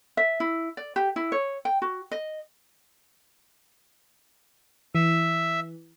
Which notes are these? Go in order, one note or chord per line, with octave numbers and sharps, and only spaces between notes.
E5
E4
D5
G4
E4
C#5
G5
F#4
D#5
E3 E5